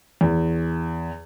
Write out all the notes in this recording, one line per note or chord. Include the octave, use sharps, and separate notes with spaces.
E2